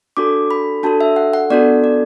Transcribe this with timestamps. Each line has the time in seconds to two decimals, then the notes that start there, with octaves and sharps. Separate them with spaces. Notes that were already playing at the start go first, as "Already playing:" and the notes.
0.17 D4 F#4 A4 D6
0.51 B5
0.83 D4 F#4 A4 A5
1.01 E5
1.16 F#5
1.33 F#5
1.50 B3 D4 F#4 A4 D5
1.84 D5